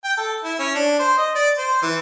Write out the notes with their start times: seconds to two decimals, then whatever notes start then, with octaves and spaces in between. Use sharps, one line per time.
0.05 G5
0.17 A4
0.44 E4
0.59 C#4
0.75 D4
1.00 C5
1.18 D#5
1.35 D5
1.58 C5
1.83 E3